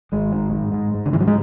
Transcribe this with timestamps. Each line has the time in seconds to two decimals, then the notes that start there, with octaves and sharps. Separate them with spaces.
0.12 G#1 G#3
0.32 G#2
0.53 G#2
0.73 G#2
0.94 G#2
1.06 D3
1.13 G#2 E3
1.20 F#3
1.27 G#3